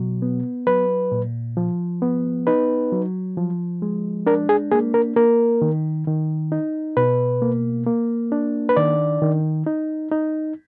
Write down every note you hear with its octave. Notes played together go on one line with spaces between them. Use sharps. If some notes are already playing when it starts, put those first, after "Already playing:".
Already playing: B2 F#3
B3
F#3 B4
A#2
F3
B3
D#4 B4
F#3
F3
G#3
D4 A#4
G#4
A#3 G#4
A#4
A#3 A#4
D#3
D#3
D#4
B2 B4
A#3
A#3
D4
B4
D#3 D5
D#3
D#4
D#4